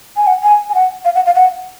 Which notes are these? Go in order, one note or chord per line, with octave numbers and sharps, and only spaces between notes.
G#5
F#5
G#5
G#5
F#5
F5
F#5
F5
F#5